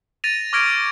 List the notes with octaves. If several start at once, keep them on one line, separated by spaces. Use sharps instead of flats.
A6 A#6 D#7 F7
C#6 D6 F6 G#6 A#6 D7